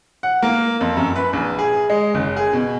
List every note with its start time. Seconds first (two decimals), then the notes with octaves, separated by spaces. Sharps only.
0.23 F#5
0.42 A#3
0.81 F2
0.97 F#2
1.15 B4
1.33 A#1
1.59 G#4
1.90 G#3
2.14 F#1
2.36 G#4
2.53 B2